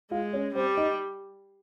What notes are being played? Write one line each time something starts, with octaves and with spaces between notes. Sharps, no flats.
G#3 F4 F5
C#4 C#5
G3 C4 C5
D#4 D#5